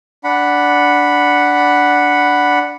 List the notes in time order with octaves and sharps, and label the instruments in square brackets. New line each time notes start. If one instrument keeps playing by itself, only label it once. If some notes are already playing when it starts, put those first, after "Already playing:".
[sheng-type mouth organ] D4 F#5 B5